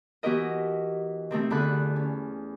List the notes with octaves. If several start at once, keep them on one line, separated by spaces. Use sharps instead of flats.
E3 B3 F#4 G4 A#4 D#5
C3 D#3 A3 C4
E2 D3 B5 F#6
C#4